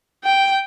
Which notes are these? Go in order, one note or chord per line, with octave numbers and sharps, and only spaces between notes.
G5